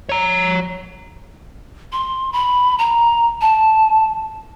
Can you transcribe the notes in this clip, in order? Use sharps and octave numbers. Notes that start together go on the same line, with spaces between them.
C#5 A#5
C6
B5
A#5
A5